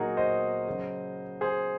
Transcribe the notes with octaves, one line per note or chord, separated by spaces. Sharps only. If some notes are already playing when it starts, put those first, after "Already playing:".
Already playing: A#2 F#3 D#4 F#4 G#4 A#4
C5 D#5
C#3 F#3
G#4 C5